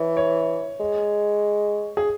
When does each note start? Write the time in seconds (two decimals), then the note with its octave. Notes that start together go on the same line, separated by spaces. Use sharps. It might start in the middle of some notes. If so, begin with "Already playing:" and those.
Already playing: E3 C#5
0.17 C#5
0.80 G#3
1.97 G#4